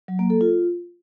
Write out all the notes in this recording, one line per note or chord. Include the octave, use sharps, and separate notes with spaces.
F#3
A#3
A4
F4